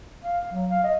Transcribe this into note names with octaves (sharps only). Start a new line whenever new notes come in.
F5
F#3
F5
D#5